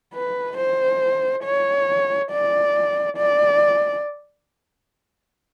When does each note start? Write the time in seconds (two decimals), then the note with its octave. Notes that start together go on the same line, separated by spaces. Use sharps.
0.14 B4
0.57 C5
1.44 C#5
2.31 D5
3.17 D5